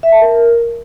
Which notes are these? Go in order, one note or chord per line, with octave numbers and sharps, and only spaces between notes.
E5
A5
A#4